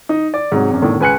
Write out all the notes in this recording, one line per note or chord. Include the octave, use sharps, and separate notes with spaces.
D#4
D5
G#2 C3 F#3
G#1 F#2
E2 A2 D3 D#3
C#2 B4 G#5 F#6 C#7